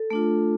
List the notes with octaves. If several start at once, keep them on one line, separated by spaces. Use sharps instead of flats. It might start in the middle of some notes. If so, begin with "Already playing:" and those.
Already playing: A4
A3 D4 F4